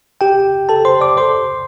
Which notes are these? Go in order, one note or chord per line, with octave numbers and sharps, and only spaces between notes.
G4 G5
A4 A5
C5 C6
D5 D6
C5 C6